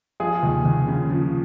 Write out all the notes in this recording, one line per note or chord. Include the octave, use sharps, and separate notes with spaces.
F3 F4 G#4
D#2
D#2
C#3
F3